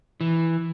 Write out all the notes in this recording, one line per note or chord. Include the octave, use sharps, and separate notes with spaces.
E3